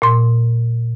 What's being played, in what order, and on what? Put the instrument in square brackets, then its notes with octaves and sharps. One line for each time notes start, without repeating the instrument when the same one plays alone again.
[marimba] A#2 C6